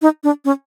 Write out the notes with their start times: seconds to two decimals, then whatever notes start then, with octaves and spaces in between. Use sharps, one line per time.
0.02 D#4
0.24 D4
0.45 C#4